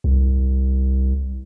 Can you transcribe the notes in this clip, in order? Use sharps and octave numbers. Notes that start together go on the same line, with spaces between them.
C2